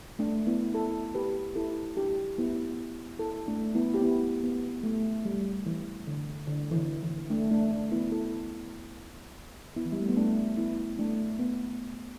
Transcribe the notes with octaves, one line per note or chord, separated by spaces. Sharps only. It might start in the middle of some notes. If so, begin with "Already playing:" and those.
A3 D4
B3 E4
E4 A4
G4 B4
E4 A4
D4 G4
B3 E4
E4 A4
A3 D4
B3 E4
G4
B3 E4
B3
A3
G3
E3
D3
D3
E3
D3
E3
A3 D4
A3 D4
A3 D4
B3 E4
E4 A4
B3 E4
E3
G3
A3
B3
A3 D4
B3 E4
A3 D4
B3